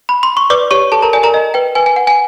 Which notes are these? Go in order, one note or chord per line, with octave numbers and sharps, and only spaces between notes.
B5
C6
C#6
B4 D5 D6
G4 C#5 C#6
G4 A4 A5
A#4 A#5
D5 G#5
A#4 A#5
D#5
B4 G5
B4 G#5
G#5
F#5
G#5